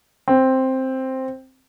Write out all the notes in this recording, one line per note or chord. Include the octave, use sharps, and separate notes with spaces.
C4